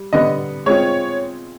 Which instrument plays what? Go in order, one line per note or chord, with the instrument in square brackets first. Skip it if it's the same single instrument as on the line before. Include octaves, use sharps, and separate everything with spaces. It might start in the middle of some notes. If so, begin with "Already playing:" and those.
Already playing: [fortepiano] G3
[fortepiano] D3 G3 B3 [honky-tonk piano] D#5
[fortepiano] G#3 C4 F4 [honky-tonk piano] C#5